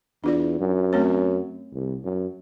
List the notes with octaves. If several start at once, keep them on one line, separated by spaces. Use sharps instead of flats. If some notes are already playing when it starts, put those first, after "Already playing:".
E2 D4 F4 D5
F#2
A3 C4 C#5
C2
F#2